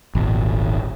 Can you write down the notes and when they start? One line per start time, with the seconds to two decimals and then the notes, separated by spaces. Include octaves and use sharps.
0.15 D#1 G#1